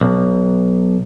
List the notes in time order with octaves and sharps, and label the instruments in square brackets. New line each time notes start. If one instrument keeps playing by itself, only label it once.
[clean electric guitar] B1